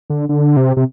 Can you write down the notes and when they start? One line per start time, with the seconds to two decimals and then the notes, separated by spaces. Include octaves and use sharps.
0.10 D3
0.29 D3
0.57 C3
0.77 C3